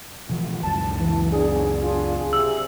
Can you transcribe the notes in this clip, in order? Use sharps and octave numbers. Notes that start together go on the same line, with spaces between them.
B2 E3 F3
C#2 F#2 A5
E3
B3 C#4 D4 G#4
D4 F4
C3 E6